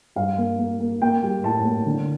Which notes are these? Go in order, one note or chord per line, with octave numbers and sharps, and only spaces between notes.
G2 F5
A#3
A#3
A#3
A#3 G5
G3
A2 A5
A#3
D3